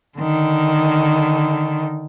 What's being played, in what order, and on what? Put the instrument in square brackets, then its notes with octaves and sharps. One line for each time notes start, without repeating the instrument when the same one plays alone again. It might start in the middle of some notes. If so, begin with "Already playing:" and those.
[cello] D3 D#3